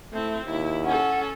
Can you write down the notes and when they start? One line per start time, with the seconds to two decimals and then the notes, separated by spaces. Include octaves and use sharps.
0.13 A3 C4 E4
0.45 D#2 E4
0.85 C#4 A4 F#5